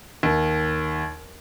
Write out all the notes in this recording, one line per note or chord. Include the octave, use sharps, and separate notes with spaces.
D#2